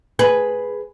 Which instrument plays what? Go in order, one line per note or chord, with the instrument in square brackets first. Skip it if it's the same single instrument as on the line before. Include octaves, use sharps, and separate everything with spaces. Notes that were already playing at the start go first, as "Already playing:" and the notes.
[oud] G#4 B4